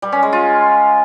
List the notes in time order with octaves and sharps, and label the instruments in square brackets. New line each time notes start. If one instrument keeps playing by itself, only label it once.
[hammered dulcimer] G3
C#4
G#3
F4